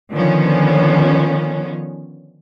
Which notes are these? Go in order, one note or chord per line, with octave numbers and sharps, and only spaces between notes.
D3 D#3 F3 B3 C#4